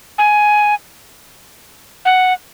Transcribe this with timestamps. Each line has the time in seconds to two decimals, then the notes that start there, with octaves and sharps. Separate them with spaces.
0.18 G#5
2.05 F#5